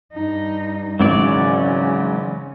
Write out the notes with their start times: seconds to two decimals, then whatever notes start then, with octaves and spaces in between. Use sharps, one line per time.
0.13 G2 D#4
1.00 G#1 C#3 E3 F#3 G#3 D5